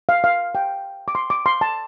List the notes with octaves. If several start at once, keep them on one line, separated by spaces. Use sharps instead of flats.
F5
F5
G5
D6
C6
D6
C6
A5